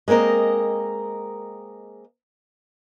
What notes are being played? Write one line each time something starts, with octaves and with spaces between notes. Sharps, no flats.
G#3 A#3 C4 A#4 D#5